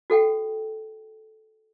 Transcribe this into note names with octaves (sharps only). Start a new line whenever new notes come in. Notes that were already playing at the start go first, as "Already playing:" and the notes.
F#4 A4 F#5 G5